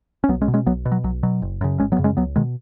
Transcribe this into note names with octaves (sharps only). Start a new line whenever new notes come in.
C#4
B1 F#3 B3
G#3 C#4
B2
G#3 C#4
B1 F#3 B3
B2
F#3
B1 F#3
B2 F#3
F#1
F#2 C#3
G#1 G#3 C#4
F#3 B3
F#2 C#3
G#3 C#4
C#2 F#3 B3
B2 D#3 G#3